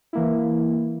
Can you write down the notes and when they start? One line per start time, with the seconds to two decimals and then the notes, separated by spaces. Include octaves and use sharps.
0.13 E3 A#3 E4